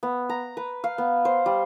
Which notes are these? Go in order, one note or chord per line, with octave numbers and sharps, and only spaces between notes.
B3
A#5
B4
F5
B3
C5
G3